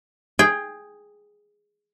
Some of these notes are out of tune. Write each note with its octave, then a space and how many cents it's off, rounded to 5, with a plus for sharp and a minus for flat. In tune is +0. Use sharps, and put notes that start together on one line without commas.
G#4 +0 G5 +20